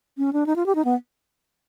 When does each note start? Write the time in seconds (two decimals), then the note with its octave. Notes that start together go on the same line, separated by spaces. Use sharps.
0.18 C#4
0.33 D4
0.46 D#4
0.56 F4
0.66 G4
0.75 D#4
0.85 B3